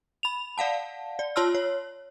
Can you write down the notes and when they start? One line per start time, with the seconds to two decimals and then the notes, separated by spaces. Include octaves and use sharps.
0.23 B5 F7
0.58 D5 F5 F#5 A5
1.19 D5
1.36 F4 C#5 A5 C6 E6 F6
1.55 C#5